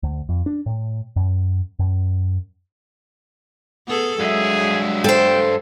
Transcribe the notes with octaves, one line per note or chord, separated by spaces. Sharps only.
D2
F2
D4
A2
F#2
F#2
B3 G#4 A4
G2 F#3 G#3 G#4 E5
A4 C5 G5